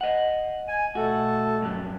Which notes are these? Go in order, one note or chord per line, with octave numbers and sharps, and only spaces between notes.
D#5 F#5
G#5
B2 A3 F#4 A4
G2 F#3